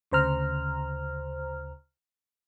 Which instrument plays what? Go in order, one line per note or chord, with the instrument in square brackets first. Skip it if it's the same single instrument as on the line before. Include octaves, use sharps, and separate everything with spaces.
[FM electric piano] D2 C#3 C5 A#5 F6